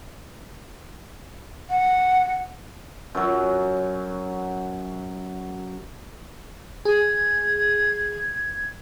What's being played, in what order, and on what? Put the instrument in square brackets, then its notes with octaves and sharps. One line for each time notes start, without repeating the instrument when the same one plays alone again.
[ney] F#5
[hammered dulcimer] F#2 F#3
[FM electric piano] G#4 [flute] G#6